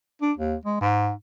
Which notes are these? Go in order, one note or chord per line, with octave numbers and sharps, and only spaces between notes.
D4
D#2
G#3
G#2